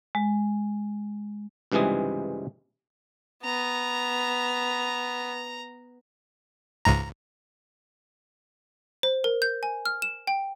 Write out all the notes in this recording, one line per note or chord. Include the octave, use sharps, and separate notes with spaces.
G#3
C#2 G2 C3 E3 G#3 G#4
B3 A#5
C#2 G#2 A#5
C5
A#4
G6
G#5
F6
E7
G5